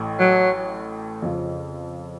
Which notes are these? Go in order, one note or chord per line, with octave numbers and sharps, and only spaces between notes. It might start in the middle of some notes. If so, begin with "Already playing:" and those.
Already playing: A1 A2 A3
F#3
F2 C#3 F3